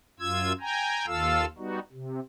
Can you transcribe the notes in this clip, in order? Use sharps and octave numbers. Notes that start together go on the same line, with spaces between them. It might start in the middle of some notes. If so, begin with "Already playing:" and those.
F#2 F4 E6 G#6
G5 G#5 A#5
D#2 F4 A4 F5 E6
G3 B3 D#4 F#4
C3